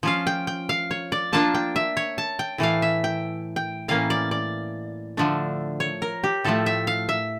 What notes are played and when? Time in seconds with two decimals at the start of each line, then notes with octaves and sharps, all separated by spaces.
0.03 F3 C#4 F4 F5
0.27 G5
0.47 G5
0.69 F5
0.91 C#5
1.12 D5
1.33 F3 A#3 D4 F4 A5
1.54 G5
1.76 E5
1.97 C#5
2.18 A5
2.39 G5
2.58 A2 E3 A3 F5
2.82 E5
3.04 G5
3.56 G5
3.88 A2 E3 A#3 C#4 F5
4.10 D5
4.31 D5
5.17 D3 F3 A3 D4
5.80 C#5
6.02 A#4
6.24 G4
6.44 A2 F3 A3 A4
6.66 E5
6.87 F5
7.09 E5